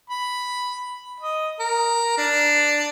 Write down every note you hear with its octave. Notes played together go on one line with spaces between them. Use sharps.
B5
D#5
A#4
D4